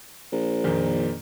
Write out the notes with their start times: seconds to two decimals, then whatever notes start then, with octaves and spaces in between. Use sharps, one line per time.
0.32 A#1
0.64 F2 A#2 D#3